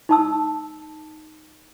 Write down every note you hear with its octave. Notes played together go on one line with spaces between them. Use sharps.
D#4 A5 E6